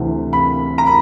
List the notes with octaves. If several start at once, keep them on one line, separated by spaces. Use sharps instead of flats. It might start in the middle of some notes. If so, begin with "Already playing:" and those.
Already playing: D2 C3 E3
B5
A#5
B5